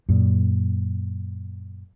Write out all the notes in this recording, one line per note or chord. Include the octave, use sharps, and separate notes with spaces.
F#2 A#2